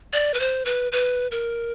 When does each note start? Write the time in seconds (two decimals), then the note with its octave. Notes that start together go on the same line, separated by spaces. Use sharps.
0.13 D5
0.34 B4
0.40 C5
0.66 B4
0.92 B4
1.31 A#4